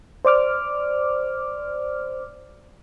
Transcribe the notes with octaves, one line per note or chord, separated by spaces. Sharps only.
C5 D5 D6 F6